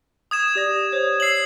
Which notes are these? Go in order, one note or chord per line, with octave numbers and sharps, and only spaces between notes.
D#6 G#6 E7
G4 D5 A#6
C5 C#5
C#5 E6 C7 F#7